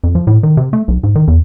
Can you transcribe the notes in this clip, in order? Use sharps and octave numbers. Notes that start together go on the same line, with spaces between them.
F2
F3
A2
D#3
C3
A3
B1
G#2
D#3
E2